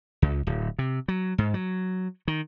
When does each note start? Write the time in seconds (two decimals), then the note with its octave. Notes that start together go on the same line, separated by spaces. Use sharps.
0.22 C#2
0.47 D1
0.79 C3
1.08 F#3
1.38 G#2
1.54 F#3
2.28 D#3